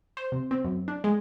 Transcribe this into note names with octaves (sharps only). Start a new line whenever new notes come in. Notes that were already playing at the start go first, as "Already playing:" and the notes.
C5
C3
C4
F#2
D4
G#3